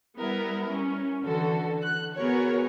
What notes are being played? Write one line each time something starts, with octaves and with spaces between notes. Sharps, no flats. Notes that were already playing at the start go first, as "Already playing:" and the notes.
G3 B3 E4 A#4
C#4
D3 E3 F#4 A4
F#6
B3 F#4 G#4 A#4 C#5